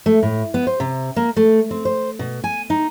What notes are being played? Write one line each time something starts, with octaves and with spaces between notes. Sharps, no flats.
A3
A2
B3
C5
C3
A#3
A3
C4
C5
B2
G#5
D#4